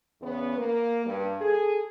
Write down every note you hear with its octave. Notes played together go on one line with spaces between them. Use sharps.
E2 C#3 B3
A#3
G2
G#4 A4